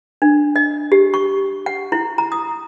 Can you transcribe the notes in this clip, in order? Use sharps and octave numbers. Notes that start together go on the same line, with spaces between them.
D4
D#5
G4
C#6
F#5
E4
A#5
D#6